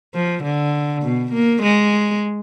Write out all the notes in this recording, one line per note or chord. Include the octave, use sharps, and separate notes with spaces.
F3
D3
B2
A#3
G#3